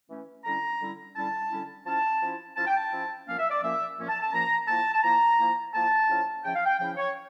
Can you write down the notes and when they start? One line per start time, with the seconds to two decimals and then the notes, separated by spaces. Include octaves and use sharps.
0.09 E3 A3 C#4
0.44 D3 G3 C#4 E4 A#5
0.80 D3 G3 C#4 E4
1.16 D3 G3 C#4 E4 A5
1.50 D3 G3 C#4 E4
1.86 F3 C#4 E4 A5
2.21 F3 C#4 E4
2.56 F3 C#4 E4 A5
2.66 G5
2.76 A5
2.91 F3 C#4 E4
3.27 A#2 F3 A#3 C#4 F5
3.39 E5
3.50 D5
3.62 A#2 F3 A#3 C#4 E5
3.97 A#2 F3 A#3 C#4
4.09 A5
4.21 A5
4.32 A#2 F3 A#3 C#4 A#5
4.67 F3 A#3 E4 A5
4.93 A5
5.03 F3 A#3 E4 A#5
5.38 F3 A#3 E4
5.73 F3 A#3 E4 A5
6.08 C#3 F3 C#4 E4
6.44 C#3 F3 C#4 E4 G5
6.55 F5
6.66 G5
6.79 C#3 F3 C#4 E4 G5
6.97 C#5